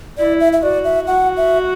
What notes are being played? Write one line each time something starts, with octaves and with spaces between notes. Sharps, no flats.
E4 D5
E5
E5
F#4 D5
E5
F#4 F#5
E5